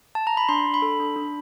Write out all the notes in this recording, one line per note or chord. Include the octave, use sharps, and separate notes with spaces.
A5
A#5
B5
D4 C6
D4
B5
A4
D4
D4